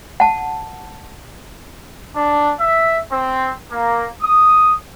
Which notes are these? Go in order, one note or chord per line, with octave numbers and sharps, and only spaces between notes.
F#5 A5
D4
E5
C4
A#3
D#6